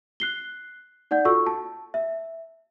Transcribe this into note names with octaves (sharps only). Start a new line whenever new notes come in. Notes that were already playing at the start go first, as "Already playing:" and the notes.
F#6 C7 G7
D#4 D5 F#5 G6
F4 F#4 A4 C#6 E6
A5
E5